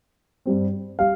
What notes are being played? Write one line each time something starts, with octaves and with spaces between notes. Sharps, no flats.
G2 G3 C4
G3 F5